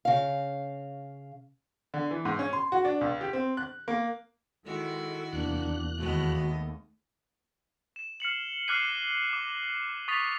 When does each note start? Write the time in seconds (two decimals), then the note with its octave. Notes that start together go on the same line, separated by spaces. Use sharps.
0.05 C#3 F5
1.94 D3
2.11 E3
2.25 G#2
2.39 C#4
2.53 C6
2.72 F#4
2.85 D4
3.01 C#2
3.21 G4
3.33 C4
3.57 F#6
3.88 A#3
4.65 D#3 G#3 E4 F#4 A4
5.33 E2 C3 A#3 D4 F#6
5.98 D#2 G#3 A3 B3 F#4 D#5
7.96 E7
8.20 F6 C7 C#7 F#7
8.68 D6 F6 F#6 G#6 C7 D#7
9.33 D6
10.08 C#6 D#6 A6 B6 F7